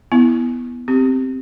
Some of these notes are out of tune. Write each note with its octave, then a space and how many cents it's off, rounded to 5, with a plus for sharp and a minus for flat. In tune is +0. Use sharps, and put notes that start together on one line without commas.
B3 -5 E4 +0
C4 +0 G4 +0